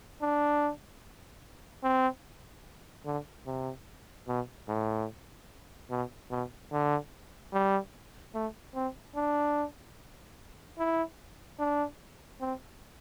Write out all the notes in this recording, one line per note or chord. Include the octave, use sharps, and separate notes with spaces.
D4
C4
D3
C3
B2
A2
B2
B2
D3
G3
A3
C4
D4
E4
D4
C4